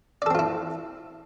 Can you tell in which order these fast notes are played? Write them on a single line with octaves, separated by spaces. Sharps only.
D5 A4 C4 F4 E4